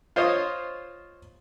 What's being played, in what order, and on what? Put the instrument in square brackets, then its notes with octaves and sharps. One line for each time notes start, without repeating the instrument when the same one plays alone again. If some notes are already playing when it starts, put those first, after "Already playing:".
[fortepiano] F4 C5 C#5 D#5